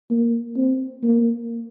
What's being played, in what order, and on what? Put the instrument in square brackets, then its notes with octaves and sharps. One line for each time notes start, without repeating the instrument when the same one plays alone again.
[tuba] A#3
C4
A#3